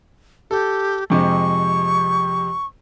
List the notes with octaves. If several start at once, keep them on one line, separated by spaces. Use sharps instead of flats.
G4 A4
F2 C3 G#3 C#6